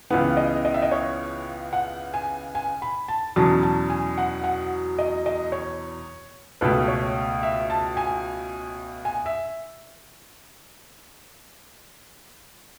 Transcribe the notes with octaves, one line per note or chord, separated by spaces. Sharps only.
C#2 C#3 E3 B3 F#5
D#5
D#5
E5
D#5
C#5
F#5
G#5
G#5
B5
A5
E2 B2 F#3 C#4 A5
A5
G#5
F#5
F#5
D#5
D#5
C#5
C#2 B2 A3 B4
C#5
E5
A5
G#5
G#5
E5